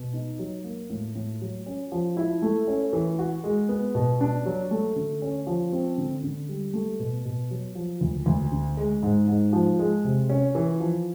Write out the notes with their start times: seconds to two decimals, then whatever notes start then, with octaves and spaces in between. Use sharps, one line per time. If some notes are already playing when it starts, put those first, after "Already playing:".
Already playing: B2
0.14 D#4
0.39 F#3
0.64 A#3
0.90 A2
1.15 A2
1.41 F#3
1.66 C#4
1.92 F3
2.17 E4
2.42 A3
2.68 C#4
2.93 E3
3.19 F#4
3.44 G#3
3.69 B3
3.95 B2
4.21 D4
4.46 F#3
4.71 A3
4.96 D3
5.22 C#4
5.47 F3
5.72 C4
5.98 D3
6.24 D3
6.49 G3
6.73 A3
6.99 B2
7.25 B2
7.50 F#3
7.75 F3
8.01 D2
8.26 D2
8.52 D3
8.77 G#3
9.03 G#2
9.28 G#2
9.53 F3
9.79 G#3
10.04 C3
10.30 C#4
10.55 E3
10.80 F3